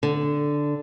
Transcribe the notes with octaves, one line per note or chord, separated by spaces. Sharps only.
D3